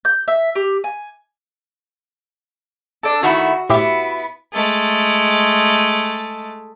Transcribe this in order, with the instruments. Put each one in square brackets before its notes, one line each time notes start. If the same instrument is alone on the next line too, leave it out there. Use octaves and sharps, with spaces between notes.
[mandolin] G6
E5
G4
G#5
D4 A4
[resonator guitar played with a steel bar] D#3 A3 E4 [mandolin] F#4
[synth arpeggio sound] A2 G4 E5 [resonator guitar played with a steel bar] B3 E4
[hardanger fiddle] G#3 A3